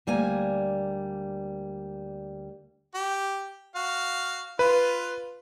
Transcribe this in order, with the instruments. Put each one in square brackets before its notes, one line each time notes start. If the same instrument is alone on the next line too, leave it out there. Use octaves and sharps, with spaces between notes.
[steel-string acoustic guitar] D2 G3 A#3 G#5
[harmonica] G4
F#4 F5
[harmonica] F4 [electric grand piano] B4